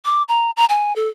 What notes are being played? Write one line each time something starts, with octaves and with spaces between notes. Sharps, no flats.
D6
A#5
A#5
G#5
A4